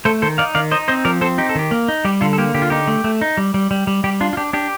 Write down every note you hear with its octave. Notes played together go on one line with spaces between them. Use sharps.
A3 A4 C5
D#3 A4 C5
D#4 D5 F5
D#3 D5 F5
D#4 C5 D#5
C4 C5 D#5
F3 A#4 D5
C4 A4 C5
D#4 G4
A4
D#3 G4
A#3
D#4
G3 G4
D3 F4 A4
A4
A#3 G4
D3 G4
F4
D#4 G4
A3
A3
D#4
G3
G3
G3
G3
G3 G4
D4 F4
F4
D4 G4
D4 G4